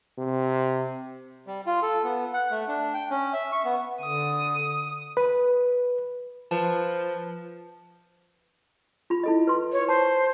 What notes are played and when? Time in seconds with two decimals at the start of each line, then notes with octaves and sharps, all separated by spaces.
0.18 C3
1.47 G3
1.66 F4
1.82 A4
2.04 B3
2.34 F#5
2.51 A3
2.68 D4
2.94 G5
3.10 C#4
3.33 E5
3.52 C#6
3.65 B3
4.01 D3 D#6
5.17 B4
6.51 F3 B4 A5
9.10 F4 B5
9.24 E4 A4 D#5
9.47 B4 C6
9.72 C#5
9.89 C5 A5